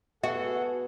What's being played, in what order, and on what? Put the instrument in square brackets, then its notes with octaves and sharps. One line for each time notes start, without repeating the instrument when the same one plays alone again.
[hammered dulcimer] B3 [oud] F#4 [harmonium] G#4 A4 F#5 [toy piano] E5